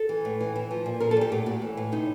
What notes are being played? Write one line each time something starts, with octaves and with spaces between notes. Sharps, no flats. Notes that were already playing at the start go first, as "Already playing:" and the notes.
Already playing: A4
E3
A2
E3
E3
F3
A#2
F3 A#4
A4
A#2 G4
A2 G4
A2 F#4
E3
A2
C3 D#4